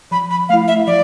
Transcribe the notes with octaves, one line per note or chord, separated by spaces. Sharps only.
F3 B5
B5
A3 E4 F5
E5
F3 D5